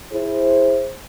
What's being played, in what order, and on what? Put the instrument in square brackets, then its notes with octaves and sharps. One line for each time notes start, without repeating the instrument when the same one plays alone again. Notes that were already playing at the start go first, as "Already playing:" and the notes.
[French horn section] E4 G#4 C5